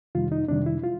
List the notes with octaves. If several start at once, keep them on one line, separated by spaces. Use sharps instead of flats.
F2 C3 D#3 G3 F4
D#4
F2 C3 D#3 G3 D4
E4
F4